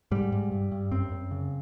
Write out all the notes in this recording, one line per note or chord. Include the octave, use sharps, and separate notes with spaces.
G#2 G3
G#2
G2
G2
F#2 C4
F#2
C#3